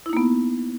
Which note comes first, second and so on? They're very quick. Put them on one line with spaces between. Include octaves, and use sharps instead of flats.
E4 D#4 A#3 B3